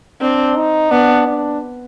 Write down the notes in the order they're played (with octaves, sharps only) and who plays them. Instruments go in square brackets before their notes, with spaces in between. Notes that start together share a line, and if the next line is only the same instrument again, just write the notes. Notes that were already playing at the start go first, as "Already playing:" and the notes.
[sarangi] C4 [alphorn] D4
[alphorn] D#4
[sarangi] B3 [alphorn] D4
[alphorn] D4